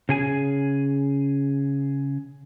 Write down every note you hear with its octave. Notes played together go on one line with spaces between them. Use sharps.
C#3 G#4 G#5